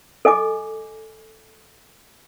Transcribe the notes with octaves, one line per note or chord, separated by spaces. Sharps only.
A4 D#5 G#5 D6